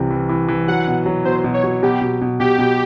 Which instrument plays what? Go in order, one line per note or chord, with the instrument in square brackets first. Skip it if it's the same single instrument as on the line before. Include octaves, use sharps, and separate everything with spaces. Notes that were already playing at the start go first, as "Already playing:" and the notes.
Already playing: [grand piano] C2 C3 E3
E3
E3
E3
[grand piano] F#3 [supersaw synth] F#5
[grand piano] B2
F#3
[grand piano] B2 [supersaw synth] C5
[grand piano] B2
[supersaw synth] C#5
[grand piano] F#3
[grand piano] B2 [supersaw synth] G4
[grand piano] B2
B2
[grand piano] B2 [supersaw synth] G4
[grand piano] B2